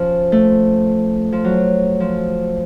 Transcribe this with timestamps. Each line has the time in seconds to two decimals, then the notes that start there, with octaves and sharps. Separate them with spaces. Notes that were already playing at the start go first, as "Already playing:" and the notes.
Already playing: F3 C#4
0.32 A3
1.32 F3
1.45 F#3
2.00 F3